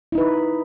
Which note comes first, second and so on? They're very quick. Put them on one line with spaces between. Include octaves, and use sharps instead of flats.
E4 D#4 B4